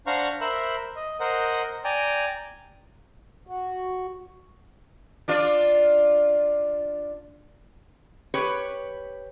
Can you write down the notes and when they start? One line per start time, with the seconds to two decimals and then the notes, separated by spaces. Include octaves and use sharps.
0.07 D4 C5 F5 F#5 A#5 C#6
0.41 A#4 C5 E5 B5 E6 F#6
0.96 D#5
1.20 A#4 C5 D#5 F#5
1.84 D5 G5 G#5 A#5
3.47 F#4
5.28 D4 F4 D5
8.34 G4 B4 C#5